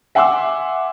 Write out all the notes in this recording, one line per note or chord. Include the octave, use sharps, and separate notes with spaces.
E5 F#5 G#5 C6 D6 E6